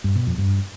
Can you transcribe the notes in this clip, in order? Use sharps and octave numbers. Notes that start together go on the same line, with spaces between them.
G2
B2
F2
G2